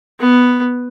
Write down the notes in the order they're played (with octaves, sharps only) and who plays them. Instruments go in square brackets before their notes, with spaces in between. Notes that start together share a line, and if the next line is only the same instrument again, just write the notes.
[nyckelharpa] B3